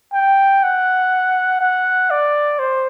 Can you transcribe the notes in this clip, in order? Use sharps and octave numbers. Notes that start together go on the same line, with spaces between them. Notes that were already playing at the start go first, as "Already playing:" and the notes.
G5
F#5
F#5
D5
C5